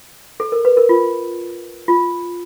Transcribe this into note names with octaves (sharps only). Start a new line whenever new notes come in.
A4
A#4
B4
A#4
F4
F4